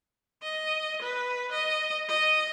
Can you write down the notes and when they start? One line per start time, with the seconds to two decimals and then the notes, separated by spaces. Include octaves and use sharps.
0.43 D#5
1.02 B4
1.52 D#5
2.09 D#5